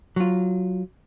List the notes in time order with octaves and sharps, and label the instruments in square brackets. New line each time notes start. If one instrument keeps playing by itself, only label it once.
[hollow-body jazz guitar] F#3 F4